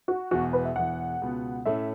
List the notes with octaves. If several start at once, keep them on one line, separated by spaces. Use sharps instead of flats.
F#4
E1 E2 B2 F#4
B4
E5
E1 E2 E3 F#5
C#2 B2 B3
A2 A3 C#4 E5